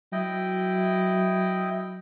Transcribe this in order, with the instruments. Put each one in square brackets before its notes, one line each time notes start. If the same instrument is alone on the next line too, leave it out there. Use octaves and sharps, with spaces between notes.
[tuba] F#3 [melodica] E4 D#5 G5